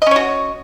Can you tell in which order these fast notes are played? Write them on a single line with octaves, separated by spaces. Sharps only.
D#5 C#4 C#5 F#4